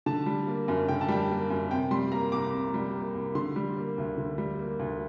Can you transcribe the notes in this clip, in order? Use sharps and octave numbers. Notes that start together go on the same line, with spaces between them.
D3 A5
G3
A#3
F#2
D3 G5
A5
G3 G5
A#3
F#2
C3 G5
G3 C6
A#3 A#5
C2 D6
C3
G3
A#3
C2
D3 C6
G3
A#3
D2
D3
G3
A#3
D2